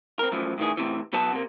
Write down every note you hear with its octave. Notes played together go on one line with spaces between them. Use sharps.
C4 A#4
F#2 A2 E3 F3
A2 D#3 E3 G#4
A2 C3 E3
B2 F#3 B3 B4 A5
C3 A#3